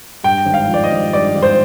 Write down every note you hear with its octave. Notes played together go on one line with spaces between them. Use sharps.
G2 G5
G#1
F5
F3
D5
D#5
G#1
G2 D5
G#1
C5